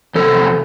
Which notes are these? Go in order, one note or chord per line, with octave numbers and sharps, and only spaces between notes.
E2 C3 A4